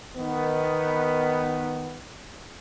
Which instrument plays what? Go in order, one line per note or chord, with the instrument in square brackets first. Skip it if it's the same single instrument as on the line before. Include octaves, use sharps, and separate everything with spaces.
[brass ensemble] D#3 B3